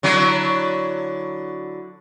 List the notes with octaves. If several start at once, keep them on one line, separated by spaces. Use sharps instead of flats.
D3 F#3 E4